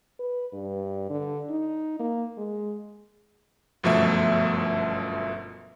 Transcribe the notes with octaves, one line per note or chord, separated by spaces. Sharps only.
B4
G2
D3
D#4
A#3
G#3
G1 F#2 B2 F3 A3 E5